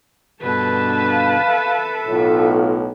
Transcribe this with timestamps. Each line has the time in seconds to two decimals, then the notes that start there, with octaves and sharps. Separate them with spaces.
0.42 G2 B2 D3 B4 A5
1.11 F5
1.48 A4 E5
2.07 B1 A2 F4